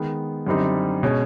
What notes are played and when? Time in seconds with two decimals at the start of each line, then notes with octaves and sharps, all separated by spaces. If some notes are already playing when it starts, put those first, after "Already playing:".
Already playing: D#3 G#3 B3
0.47 F#2 D3 G3 C4 D#4
1.03 B2 G#3 C#4